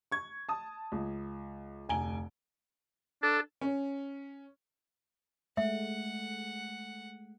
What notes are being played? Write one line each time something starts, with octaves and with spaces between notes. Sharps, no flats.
C#6 G#6
A5 D#6
C#2
F1 D2 G#5 A#5 D7 G7
D4 A4
C#4
G#3 A3 E5 F#5